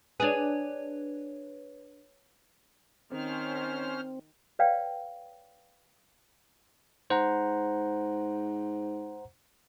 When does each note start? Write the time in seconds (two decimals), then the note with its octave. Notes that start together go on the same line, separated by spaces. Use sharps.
0.20 D4 G#4 B4 C#5
3.12 D#3 C4 C#4 C5 F6
4.59 B4 C#5 D5 F5 G5
7.10 G#2 C5 F#5 A#5